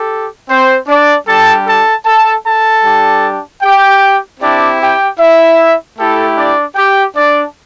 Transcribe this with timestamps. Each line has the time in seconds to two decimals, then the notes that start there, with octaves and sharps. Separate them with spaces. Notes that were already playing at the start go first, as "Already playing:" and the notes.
Already playing: G4 A4
0.49 C4 C5
0.87 D4 D5
1.27 G3 D4 G4 A4 A5
1.66 A4 A5
2.05 A4 A5
2.45 A4 A5
2.84 G3 D4 G4
3.62 G4 G5
4.40 C4 D4 E4 G4 D5
4.80 G4 G5
5.19 E4 E5
5.98 A3 E4 G4 A4
6.36 D4 D5
6.76 G4 G5
7.15 D4 D5